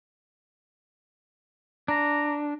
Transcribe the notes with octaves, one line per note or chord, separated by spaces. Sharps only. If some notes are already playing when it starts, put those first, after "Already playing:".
D4 A#5